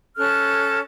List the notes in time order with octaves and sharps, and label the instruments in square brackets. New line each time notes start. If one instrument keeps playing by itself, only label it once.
[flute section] C#4 A4 F6 F#6